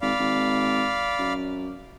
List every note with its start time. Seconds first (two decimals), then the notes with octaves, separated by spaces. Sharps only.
0.02 G#1 D5 F5 B5
0.19 G#1
1.19 F#2